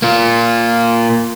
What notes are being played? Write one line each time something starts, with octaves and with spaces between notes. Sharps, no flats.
A#3 F4